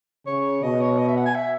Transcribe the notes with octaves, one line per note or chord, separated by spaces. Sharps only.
C#3 C#5
B2 D#5
C#5
D#5
E5
F#5
G#5
E5